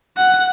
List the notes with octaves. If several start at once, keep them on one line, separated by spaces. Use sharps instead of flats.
F#5